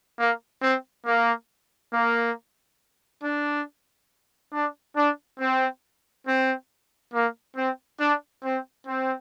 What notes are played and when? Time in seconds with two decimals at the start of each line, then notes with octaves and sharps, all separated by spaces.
0.19 A#3
0.62 C4
1.07 A#3
1.93 A#3
3.23 D4
4.53 D4
4.97 D4
5.40 C4
6.27 C4
7.14 A#3
7.57 C4
8.00 D4
8.44 C4
8.87 C4